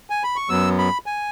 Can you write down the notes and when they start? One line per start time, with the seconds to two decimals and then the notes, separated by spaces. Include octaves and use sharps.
0.10 G#5
0.24 B5
0.36 C#6
0.49 F#2 F#3 B3 E6
0.78 B5
1.06 G#5